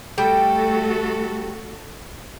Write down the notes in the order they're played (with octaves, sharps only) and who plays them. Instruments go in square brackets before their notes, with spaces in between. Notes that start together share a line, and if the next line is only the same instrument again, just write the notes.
[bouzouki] G3 G5 [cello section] A3 F#4 A4